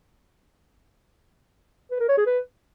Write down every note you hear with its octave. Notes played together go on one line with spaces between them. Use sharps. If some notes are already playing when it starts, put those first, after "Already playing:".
B4
A#4
C#5
G#4
B4